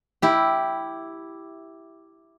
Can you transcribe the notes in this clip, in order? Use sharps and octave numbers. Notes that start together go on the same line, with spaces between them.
E4 G4